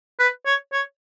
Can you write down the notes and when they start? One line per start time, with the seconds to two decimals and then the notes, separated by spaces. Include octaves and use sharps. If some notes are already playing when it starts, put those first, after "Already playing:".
0.19 B4
0.46 C#5
0.72 C#5